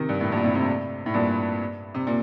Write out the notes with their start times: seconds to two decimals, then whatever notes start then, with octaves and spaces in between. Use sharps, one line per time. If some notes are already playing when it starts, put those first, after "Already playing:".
Already playing: C3 D#3
0.09 G2
0.21 A2
0.32 G2 A#2
0.44 A2 C3
0.55 A2 C3
1.06 A2
1.14 G2 A#2
1.95 C3
2.07 A#2